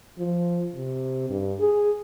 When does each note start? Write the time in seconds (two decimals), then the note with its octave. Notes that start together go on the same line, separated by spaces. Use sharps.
0.19 F3
0.76 C3
1.30 G2
1.60 G#4